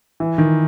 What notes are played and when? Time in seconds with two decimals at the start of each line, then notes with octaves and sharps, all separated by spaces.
0.20 E3
0.38 D#3